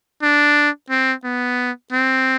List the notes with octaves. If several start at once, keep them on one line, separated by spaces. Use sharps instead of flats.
D4
C4
B3
C4